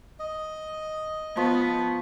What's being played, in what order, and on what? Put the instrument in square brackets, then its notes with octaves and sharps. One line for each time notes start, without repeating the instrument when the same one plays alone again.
[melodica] D#5
[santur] F3 C#6 [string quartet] B3